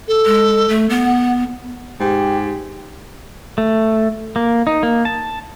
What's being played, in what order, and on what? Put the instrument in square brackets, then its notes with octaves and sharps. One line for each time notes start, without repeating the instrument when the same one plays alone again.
[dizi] A4
[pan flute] G#3
A3
B3
[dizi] F#5
[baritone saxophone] G#2 [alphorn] G4
[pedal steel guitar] A3
A#3
D#4
A#3
A5